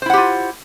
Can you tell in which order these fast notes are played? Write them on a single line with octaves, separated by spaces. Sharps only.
C5 E4 F#5 G4 F4